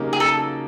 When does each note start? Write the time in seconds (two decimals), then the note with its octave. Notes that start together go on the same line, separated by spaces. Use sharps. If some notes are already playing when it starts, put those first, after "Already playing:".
Already playing: C#3 F#3 A#3 D#4 G4
0.13 G#4
0.20 A4